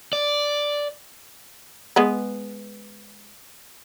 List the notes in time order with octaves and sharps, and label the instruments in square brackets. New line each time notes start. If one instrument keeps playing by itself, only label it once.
[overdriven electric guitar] D5
[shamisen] G#3 B3 B4